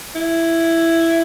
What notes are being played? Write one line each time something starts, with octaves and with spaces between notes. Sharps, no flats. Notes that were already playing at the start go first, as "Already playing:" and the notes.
E4